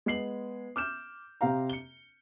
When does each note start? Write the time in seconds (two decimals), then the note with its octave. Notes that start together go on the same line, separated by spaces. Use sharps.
0.06 G#3 B3 C7 F#7
0.76 D6 F6 G6 E7
1.41 C3 C4 G4 F5 A#5
1.70 C#7 G7